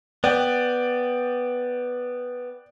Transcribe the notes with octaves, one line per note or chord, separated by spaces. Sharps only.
B3 D5 G5